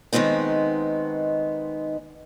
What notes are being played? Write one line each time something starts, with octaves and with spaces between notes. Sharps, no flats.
D#3 G#3 B3 C4 D#4